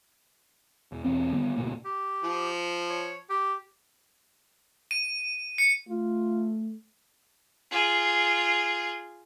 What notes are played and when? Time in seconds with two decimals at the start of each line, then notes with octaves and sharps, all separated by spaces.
0.92 E1
1.04 E1 E2 C4
1.31 G#1 D3 G3 B3
1.56 D2 G#2 B2 A#3
1.85 G4
2.24 F3
2.90 C#5
3.30 G4
4.91 D#7
5.58 C#7
5.88 A3 F4
7.71 F4 G#4